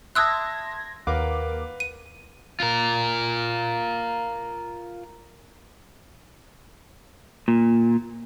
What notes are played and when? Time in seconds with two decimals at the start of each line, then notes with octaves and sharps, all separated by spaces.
0.15 E5 A5 C6 D#6 E6 F#6 G#6 A#6
1.07 D#2 A#4 B4 F5 F#5 D6
1.80 D#7
2.60 F4 A#4
7.48 A#2